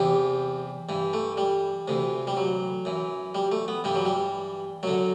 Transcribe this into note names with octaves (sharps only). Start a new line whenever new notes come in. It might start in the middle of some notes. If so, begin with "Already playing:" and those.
Already playing: E2 C3 E3 G4
G2 E3
A3
G3
D2 C3 E3
G3
F#3
F#2 E3
G3
A3
B3
G2 E3 G3
F#3
G3
F#2 D3 F#3